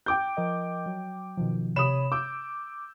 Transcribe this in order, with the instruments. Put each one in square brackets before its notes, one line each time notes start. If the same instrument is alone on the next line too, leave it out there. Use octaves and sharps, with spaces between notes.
[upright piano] G5 D6 G6
[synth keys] F3 A#4 D#5
F#3
B2 D#3 F3
[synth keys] C3 C#5 B5 [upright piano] D#6 E7
[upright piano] D6 [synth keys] E6 G6